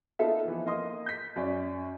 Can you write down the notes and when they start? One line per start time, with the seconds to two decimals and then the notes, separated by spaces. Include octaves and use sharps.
0.19 A#3 B3 D#4 F4 A4 E5
0.45 E3 F3
0.66 A#3 D#5 C6 D#6
1.06 G6 B6
1.36 F#2 C#4 D5